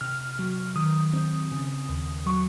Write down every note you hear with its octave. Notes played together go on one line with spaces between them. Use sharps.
C3 F6
F#3
D#3 D#6
C4
C#3
D#2
F#3 C#6